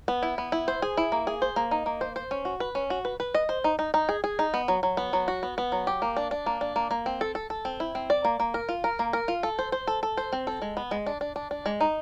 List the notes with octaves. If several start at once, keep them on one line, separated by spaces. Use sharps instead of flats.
B3
E4
B3
E4
C5
G#4
E4
A#3
G#4
C5
A#3
D#4
A#3
C5
C5
C#4
F#4
B4
C#4
F#4
B4
B4
D#5
C5
D#4
D#4
D#4
G#4
G#4
D#4
B3
F#3
F#3
B3
F#3
F#4
B3
B3
F#3
G4
A#3
D4
D4
A#3
D4
A#3
A#3
C4
A4
A4
A4
C4
E4
C4
D5
A#3
A#3
A#4
F4
A#4
A#3
A#4
F4
A4
C5
C5
A4
A4
C5
C4
A4
G#3
B3
G#3
D4
D4
D4
D4
G#3
D#4